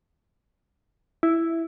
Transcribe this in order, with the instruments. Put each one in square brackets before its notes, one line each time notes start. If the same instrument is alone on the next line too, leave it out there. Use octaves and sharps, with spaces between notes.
[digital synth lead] E4